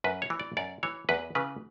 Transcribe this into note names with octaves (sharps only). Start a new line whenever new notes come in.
F#2 B4
C#5
E3
D5
F#2 D5
E3 C#5
E2 B4
C#3 E3 B4